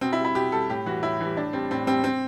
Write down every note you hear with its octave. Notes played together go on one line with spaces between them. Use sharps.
B2 C4
E4
G3
E4
B2 G4
G3 A4
A2 G4
E3 G3 F#4
A2 E4
E3 G3
A2 D4
G3 C4
A2 C4
G3 C4
C4